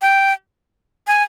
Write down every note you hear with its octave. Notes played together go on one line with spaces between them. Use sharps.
G5
G#5